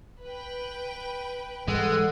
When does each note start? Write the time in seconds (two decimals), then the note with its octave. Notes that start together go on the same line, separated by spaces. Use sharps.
0.23 B4 G5
1.68 G#2 E3 G3 G#3 A4 F#5